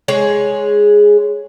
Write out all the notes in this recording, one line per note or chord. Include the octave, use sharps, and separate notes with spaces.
G#3 G#4 C#5